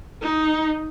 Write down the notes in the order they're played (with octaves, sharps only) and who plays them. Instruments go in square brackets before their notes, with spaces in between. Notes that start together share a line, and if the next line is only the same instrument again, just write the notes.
[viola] D#4